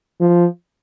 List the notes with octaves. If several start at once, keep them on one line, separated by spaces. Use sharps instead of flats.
F3